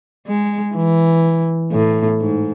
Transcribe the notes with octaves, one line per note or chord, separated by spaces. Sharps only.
G#3
E3
A2
G#2